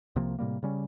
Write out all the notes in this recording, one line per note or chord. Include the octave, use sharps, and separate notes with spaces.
C2 C3 F3 A#3
A2 C3 G3 A#3
C#3 G3 C#4